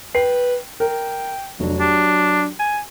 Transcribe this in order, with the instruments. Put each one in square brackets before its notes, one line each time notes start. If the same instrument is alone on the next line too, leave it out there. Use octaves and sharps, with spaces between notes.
[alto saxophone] B4 [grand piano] G5 C7
[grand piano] A#4 [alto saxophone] G5
[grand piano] F1 D4 [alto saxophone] F#3
[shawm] D4 [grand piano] G4
[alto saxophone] G#5